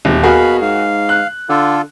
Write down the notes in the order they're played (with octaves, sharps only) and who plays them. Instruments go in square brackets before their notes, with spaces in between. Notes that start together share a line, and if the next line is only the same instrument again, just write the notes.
[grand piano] D#1 [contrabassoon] G#1
[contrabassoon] B2 [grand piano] F#4 G#4 A#4 [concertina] F5 B5
[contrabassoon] G#2 [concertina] F5
[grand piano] F#6
[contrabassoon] D3 [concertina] F4 A4